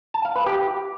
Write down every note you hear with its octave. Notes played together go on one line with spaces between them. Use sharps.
A5
F5
B4
G4